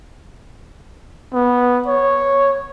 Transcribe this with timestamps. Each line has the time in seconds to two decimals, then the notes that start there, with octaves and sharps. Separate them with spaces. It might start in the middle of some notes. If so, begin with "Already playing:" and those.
1.33 B3
1.87 C#5